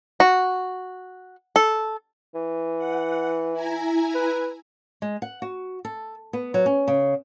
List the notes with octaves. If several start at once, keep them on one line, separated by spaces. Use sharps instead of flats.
F#4
A4
E3
F#5
E4 G#5 A#5
B4
G#3
F#5
F#4
A4
B3
F#3
C#4
C#3